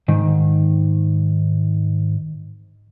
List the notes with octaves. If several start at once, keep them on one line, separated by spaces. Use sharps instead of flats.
G#2 D#3